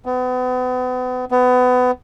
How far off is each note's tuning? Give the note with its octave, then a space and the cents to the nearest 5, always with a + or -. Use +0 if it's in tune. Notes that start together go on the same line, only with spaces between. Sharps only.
B3 +35
B3 +25